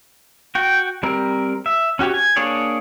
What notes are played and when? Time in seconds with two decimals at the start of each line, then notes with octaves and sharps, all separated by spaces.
0.55 F#4 G5
1.03 G3 C4 A#4
1.66 E5
1.99 C#4 F#4 G4 C#5
2.14 G#5
2.36 A#3 D4 G#4 C#5 D5